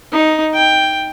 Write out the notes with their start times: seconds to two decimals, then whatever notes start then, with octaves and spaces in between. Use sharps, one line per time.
0.12 D#4
0.54 G5